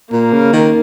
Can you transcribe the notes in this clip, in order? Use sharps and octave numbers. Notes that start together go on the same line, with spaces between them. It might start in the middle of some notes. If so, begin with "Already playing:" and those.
A#2 A#3
C#3
D#3